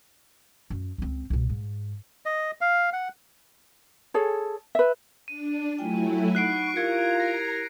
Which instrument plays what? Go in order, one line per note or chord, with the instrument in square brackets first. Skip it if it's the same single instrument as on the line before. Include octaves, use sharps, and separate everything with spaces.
[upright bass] F#2
C#2 C4
C2 B2
G#2
[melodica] D#5
F5
F#5
[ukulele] G#4 A4 C#5
B4 E5
[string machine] D4 [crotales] D#7
[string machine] F#3 A3 E4 [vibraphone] F4 G5 G#5
[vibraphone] D#4 F#5 B5 [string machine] C#6 [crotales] F#6 C7 D7
[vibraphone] E4 G4 A#4 [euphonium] F4 [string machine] A#5 [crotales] G#6 C#7
[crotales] A#6